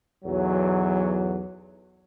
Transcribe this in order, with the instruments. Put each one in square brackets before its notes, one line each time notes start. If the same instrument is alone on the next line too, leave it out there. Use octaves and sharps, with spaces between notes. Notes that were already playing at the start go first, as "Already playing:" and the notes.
[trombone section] B1 E2 F#3